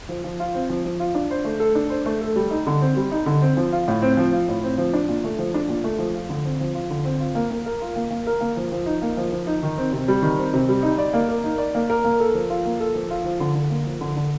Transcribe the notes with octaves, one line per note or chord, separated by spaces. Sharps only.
F3
F3
F4
C4
F3
F3
F4
D4
C5
A3
A4
D4
C5
A3
A4
G3
D#4
D3
C4
G3
D#4
D3
C4
F3
F4
A2
C4
F3
F4
A2
C4
F3
D4
A#2
A3
F3
D4
A#2
A3
F3
F4
D3
C4
F3
F4
D3
C4
F4
A#3
A#3
A#4
F4
A#3
A#3
A#4
A#3
F3
F3
D#4
A#3
F3
F3
D#4
D#3
C4
C3
G3
D#3
C4
C3
G3
D#4
D5
A#3
A#4
D#4
D5
A#3
A#4
A#3
A4
F3
F4
A#3
A4
F3
F4
F3
D3
D3
A#3
F3
D3
D3